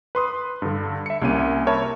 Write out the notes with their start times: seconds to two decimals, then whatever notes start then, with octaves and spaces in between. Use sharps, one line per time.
0.15 B4 C6 D#6
0.62 G2 D3
1.06 E5 C#7
1.22 C2 A#3 C#4 D#7
1.67 A#4 C#5 E5 A5 B5